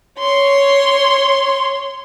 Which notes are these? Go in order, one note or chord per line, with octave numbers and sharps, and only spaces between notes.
C#5 C6